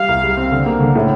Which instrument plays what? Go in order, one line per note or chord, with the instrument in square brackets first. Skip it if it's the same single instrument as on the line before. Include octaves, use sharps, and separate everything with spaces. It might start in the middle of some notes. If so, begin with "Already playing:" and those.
Already playing: [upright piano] G3 [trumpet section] F5
[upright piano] C2
G3
C4
D3
A#3
D3
A2